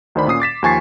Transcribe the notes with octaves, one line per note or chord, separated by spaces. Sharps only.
D2 D#3 C5 D5 B5
A#2 C#4 D#6 C7
D6 A6 B6 E7
D#2 F3 G#5 C#6 A6 C7